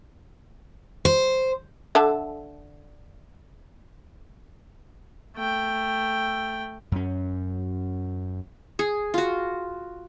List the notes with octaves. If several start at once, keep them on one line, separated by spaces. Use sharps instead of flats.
C5
D3 A4 E5
A3 G5
F#2 C#4
G#4
F4 F#4